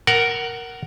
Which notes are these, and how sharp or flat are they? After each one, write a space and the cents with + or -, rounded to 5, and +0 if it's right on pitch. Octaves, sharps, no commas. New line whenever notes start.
A#4 +0 F#5 +20 A5 +0